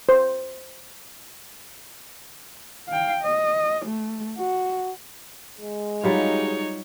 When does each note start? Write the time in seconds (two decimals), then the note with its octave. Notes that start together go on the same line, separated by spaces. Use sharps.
0.09 C5
2.89 F5 G5
3.23 D#5
3.86 A3
4.38 F#4
5.59 G#3
6.03 F#3 G3 D#4 F4 C#5